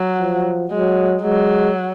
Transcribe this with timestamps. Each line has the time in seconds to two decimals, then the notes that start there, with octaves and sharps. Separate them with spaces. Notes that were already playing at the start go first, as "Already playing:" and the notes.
Already playing: F#3
0.19 F3
0.71 F#3 G#3
1.23 F#3 G#3